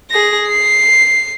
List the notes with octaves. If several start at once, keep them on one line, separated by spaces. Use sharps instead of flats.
G#4 A#6
C7